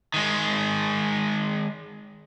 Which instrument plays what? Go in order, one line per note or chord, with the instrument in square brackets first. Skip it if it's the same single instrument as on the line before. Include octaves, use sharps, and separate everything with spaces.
[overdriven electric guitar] D#3 G#3